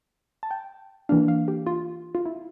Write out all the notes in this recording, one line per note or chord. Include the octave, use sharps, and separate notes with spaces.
A5
G5
E3 A#3 D4 F5
F5
G4
F4
F4
E4